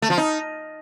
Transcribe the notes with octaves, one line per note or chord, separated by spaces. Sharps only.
A3
F3
D#4